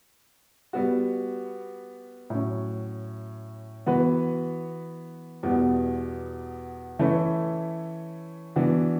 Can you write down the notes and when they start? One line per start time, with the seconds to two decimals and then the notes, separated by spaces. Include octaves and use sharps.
0.73 G3 B3 F#4
2.30 A2 F#3 C#4
3.86 E3 B3 F#4 B4
5.43 E2 B2 G3 B3
6.99 E3 A3 C#4 E4 B4
8.56 E3 B3 D4 F#4